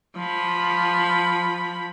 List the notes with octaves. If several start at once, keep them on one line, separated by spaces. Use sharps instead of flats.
F3 B5